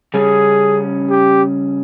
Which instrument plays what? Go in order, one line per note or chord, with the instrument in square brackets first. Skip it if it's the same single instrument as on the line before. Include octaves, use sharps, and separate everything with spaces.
[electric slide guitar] C#3 G3 C#4 [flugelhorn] G#4
[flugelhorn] G4